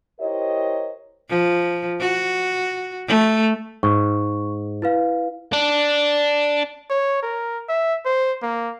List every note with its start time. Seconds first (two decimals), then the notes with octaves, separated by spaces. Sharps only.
0.20 E4 G4 A#4 C5 C#5 D#5
1.29 F3
2.00 F#4
3.08 A3
3.83 G#2 C#6
4.82 E4 B4 F5
5.53 D4
6.90 C#5
7.23 A#4
7.69 E5
8.05 C5
8.42 A#3